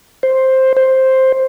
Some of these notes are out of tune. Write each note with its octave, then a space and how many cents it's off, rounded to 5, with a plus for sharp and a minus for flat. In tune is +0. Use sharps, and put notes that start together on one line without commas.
C5 +5
C5 +5